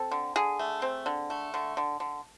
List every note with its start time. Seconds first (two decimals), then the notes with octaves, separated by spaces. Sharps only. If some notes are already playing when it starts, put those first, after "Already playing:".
Already playing: C4 A4
0.11 D3
0.36 D3 G#4
0.59 A3
0.82 C4
1.06 D3
1.30 A3
1.54 D3
1.77 D3
2.00 D3